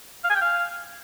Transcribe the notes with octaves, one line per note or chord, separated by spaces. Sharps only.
F5
G#5
G5
F5